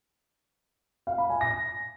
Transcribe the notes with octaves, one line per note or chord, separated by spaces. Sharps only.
F5
B5
G#5
A#6